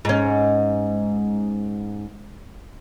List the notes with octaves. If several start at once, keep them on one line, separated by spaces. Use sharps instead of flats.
G#2 C#4